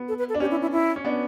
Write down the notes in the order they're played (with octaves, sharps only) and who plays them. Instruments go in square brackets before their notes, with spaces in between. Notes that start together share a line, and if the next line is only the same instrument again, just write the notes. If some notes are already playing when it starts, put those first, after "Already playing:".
Already playing: [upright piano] B3
[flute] A4
B4
A4
[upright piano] D4
[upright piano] C#4 [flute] G4
[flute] E4
E4
E4
[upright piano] C#4
B3 D4